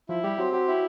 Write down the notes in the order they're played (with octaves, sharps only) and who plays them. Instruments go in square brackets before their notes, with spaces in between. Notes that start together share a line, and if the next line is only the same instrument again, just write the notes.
[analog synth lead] F3 [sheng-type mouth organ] E4
[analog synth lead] G3 [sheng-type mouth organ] G4
[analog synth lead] F#3 [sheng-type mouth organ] C4
[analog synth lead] F#3 [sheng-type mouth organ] G4
[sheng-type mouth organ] E4